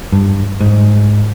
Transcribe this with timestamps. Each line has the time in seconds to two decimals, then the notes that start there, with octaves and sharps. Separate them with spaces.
0.12 G2
0.61 G#2